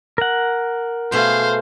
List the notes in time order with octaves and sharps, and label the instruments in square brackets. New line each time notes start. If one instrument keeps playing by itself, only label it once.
[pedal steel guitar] A#4 F#5
[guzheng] B2 A3 G#4 [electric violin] C5 F5